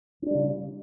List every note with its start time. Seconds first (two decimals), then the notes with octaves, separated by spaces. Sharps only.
0.22 C#4
0.26 D4
0.31 G3
0.35 C#3